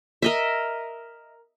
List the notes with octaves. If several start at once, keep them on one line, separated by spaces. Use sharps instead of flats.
A#4 D#5 E5